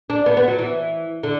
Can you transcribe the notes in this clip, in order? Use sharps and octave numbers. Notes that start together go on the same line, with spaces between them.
D4
B3
B3
F#3
E3
D3